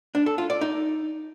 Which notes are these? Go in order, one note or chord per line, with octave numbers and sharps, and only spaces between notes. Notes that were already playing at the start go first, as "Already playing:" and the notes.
D4
A4
F4
D5
D#4